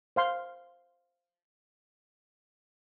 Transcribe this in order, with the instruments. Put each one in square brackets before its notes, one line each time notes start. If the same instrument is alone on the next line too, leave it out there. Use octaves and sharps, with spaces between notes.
[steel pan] C5 F5 C6